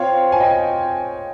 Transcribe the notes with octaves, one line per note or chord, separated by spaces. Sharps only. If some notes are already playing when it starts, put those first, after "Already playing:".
Already playing: C4 F4 C5 C#5 F5
G#5
D#5 G5